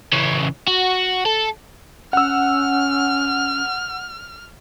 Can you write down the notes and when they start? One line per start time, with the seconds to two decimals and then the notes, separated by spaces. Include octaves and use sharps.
0.13 C#3 E3
0.68 F#4
1.25 A4
2.13 C#4 F#5 E6 F6